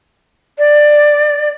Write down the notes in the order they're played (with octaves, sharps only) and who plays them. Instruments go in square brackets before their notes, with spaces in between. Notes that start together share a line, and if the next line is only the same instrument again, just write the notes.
[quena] D5